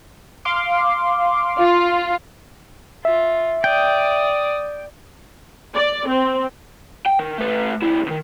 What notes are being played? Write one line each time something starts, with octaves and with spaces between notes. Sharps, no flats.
F5 C6 D6
F4
F4 E5
D5 G5 D#6
D5
C4
G5
D#3
A3 B4
C#2 E4
C#2 D#3